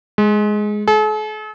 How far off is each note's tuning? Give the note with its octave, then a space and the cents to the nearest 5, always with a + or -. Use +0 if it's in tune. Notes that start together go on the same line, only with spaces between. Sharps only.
G#3 +10
A4 -45